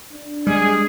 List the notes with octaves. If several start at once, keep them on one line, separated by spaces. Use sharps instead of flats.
D4
G3 G#3 G#4